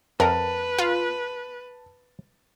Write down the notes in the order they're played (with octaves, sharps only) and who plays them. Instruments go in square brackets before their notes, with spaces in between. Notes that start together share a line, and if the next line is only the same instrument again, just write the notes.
[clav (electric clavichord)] F2 [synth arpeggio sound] A#4 [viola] B4 [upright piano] A5
[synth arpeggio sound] F4